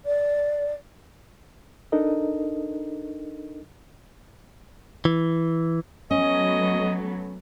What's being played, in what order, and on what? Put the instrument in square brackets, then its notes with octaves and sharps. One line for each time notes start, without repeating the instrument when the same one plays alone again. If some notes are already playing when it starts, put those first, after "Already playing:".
[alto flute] D5
[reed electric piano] D4 D#4 A4 A#4 D#5
[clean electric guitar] E3
[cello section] F#3 A3 B3 [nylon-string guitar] C#4 [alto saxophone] D#5